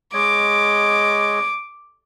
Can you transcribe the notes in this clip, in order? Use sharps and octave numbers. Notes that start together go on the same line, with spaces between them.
G#3 C#5 D#5 D6